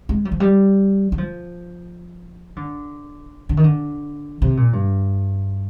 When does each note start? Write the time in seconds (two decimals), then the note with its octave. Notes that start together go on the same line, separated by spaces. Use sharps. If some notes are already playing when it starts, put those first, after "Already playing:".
0.09 G#3
0.25 G3
0.32 F3
0.40 G3
1.12 G3
1.18 F3
2.56 D3
3.49 D3
3.57 D#3
3.64 D3
4.42 C3
4.57 A#2
4.73 G2